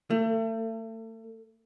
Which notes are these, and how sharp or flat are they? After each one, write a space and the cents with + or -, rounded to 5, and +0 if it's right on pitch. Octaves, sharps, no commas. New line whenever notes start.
A3 +35